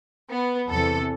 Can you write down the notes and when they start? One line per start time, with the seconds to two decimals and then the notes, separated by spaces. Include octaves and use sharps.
0.30 B3
0.70 E2 C3 E3 A4